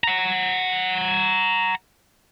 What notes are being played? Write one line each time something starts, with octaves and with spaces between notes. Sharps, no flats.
F#5 A#5